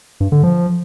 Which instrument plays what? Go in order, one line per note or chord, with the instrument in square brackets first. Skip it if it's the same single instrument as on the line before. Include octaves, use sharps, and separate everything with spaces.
[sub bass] G2
D3
F3